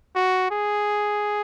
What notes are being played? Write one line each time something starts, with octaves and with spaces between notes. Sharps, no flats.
F#4
G#4